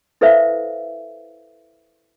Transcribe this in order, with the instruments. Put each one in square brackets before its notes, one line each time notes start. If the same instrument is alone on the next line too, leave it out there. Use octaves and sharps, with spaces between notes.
[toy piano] E4 A4 B4 C5 E5 F5